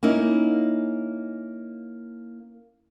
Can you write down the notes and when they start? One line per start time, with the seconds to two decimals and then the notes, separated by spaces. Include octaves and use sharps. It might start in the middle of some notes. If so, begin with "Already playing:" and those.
0.03 A#3 C#4 D#4 E4